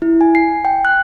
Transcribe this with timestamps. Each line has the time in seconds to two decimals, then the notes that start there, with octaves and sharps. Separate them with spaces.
0.02 E4
0.21 G#5
0.35 C7
0.65 G5
0.85 F#6